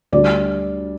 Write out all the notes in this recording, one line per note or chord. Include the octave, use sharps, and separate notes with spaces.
D2 D3 G3 D5